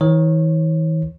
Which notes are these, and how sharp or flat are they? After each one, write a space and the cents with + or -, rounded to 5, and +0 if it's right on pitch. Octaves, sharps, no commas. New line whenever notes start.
E3 -45 C#5 -30